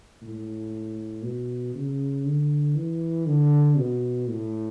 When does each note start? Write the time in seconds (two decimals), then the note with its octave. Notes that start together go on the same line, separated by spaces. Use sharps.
0.22 A2
1.23 B2
1.74 C#3
2.25 D3
2.76 E3
3.26 D3
3.77 B2
4.28 A2